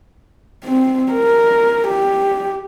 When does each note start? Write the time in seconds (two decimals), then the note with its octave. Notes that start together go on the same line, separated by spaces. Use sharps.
0.65 C4
1.12 A#4
1.88 G4